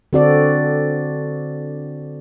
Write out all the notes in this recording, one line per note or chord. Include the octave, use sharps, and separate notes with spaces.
D3 C4 F#4 A4 D5